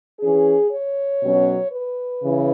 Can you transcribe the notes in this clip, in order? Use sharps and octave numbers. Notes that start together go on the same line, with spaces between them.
E3 C#4 G#4
C#5
B2 F#3 C#4
B4
C#3 E3